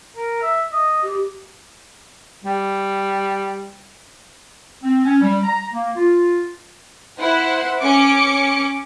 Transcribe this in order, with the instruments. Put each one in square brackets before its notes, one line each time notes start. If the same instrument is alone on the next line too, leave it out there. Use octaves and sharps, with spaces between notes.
[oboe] A#4
E5
D#5
[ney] G4
[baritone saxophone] G3
[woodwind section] C4
C#4
G3
A#5
A#3
F4
[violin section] E4 C5 F#5
C#4 D6 C#7